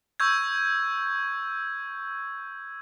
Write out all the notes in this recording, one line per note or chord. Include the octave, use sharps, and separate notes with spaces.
C#6 E6 G6 G#6